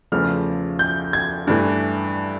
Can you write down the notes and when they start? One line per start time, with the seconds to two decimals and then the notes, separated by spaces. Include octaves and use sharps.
0.12 E2 C#3 F3 A3 F6
0.79 G6
1.13 G#6
1.47 G2 E3 A3